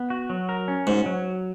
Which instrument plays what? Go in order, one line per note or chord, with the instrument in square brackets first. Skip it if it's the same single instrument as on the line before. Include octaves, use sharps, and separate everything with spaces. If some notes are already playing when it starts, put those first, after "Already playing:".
Already playing: [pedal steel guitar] B3
F#4
F#3
A#4
C#4
[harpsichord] G#2 [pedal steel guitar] F#4
[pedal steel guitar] F#3